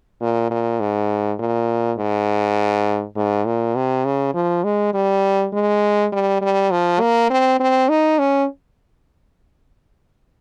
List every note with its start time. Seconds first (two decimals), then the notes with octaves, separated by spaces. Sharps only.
0.22 A#2
0.51 A#2
0.80 G#2
1.39 A#2
1.98 G#2
3.16 G#2
3.46 A#2
3.76 C3
4.05 C#3
4.35 F3
4.64 G#3
4.94 G3
5.53 G#3
6.12 G3
6.42 G3
6.71 F3
7.00 A#3
7.30 C4
7.60 C4
7.89 D#4
8.19 C#4